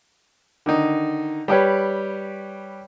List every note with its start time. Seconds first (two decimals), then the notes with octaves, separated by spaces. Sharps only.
0.66 D3 D#3 D#4
1.48 G3 G4 B4 C#5